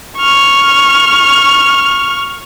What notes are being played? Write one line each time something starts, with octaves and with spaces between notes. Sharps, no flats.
C#6 F6